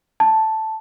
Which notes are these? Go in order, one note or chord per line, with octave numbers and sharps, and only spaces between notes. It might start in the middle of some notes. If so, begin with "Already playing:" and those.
A5